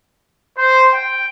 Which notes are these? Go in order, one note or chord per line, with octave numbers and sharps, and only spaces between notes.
C5
G5